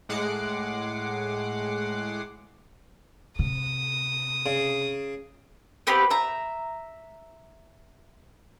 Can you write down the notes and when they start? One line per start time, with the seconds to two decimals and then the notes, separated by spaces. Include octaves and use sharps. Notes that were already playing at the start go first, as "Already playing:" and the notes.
0.09 A2 G#3 F#5 D6 C7
3.39 C3 D#6
4.46 C#3
5.87 B3 C4 G4 B4
6.10 E5 A#5